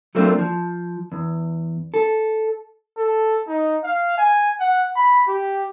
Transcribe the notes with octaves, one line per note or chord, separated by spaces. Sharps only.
F#3 A3 A#3 C4 D4 F4
F3
E2
A4
A4
D#4
F5
G#5
F#5
B5
G4